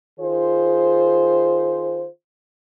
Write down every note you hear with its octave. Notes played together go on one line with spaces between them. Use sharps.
D#3 F4 G#4 C5